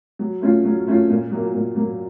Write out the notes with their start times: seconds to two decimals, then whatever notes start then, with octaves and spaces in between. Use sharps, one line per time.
0.19 F#3
0.42 A3 C#4 F4
0.65 F#3
0.87 A3 C#4 F4
1.10 A#2
1.31 F#3 A#3
1.54 A#2
1.76 F#3 A#3